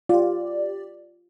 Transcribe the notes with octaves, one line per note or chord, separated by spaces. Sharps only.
F4 G4 D5